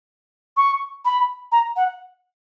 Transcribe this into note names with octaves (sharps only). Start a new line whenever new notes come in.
C#6
B5
A#5
F#5